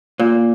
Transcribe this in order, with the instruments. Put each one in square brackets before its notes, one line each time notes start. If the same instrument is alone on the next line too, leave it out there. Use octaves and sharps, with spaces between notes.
[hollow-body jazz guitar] A#2